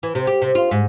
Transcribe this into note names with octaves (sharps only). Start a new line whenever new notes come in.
E3
C3
G4
C3
F4
G#2